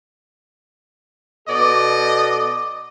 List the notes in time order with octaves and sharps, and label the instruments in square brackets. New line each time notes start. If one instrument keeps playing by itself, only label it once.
[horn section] B2 A4 D5 D#5